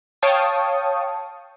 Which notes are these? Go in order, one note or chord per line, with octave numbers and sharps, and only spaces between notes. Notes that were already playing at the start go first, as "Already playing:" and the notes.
C#5 F5 G5 A5 C#6 D#6